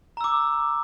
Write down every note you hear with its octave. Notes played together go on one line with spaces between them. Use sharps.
A#5 D6 E6